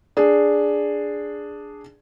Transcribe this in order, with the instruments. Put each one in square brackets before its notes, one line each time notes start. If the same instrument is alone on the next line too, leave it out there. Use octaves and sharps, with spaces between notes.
[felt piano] D4 G#4